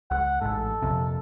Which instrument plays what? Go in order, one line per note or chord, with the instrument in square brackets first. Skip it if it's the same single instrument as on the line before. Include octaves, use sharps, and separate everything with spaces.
[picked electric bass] C#2 [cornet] F#5
[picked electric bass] A1 G#2 [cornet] A4
[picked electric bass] A#1 F2 C3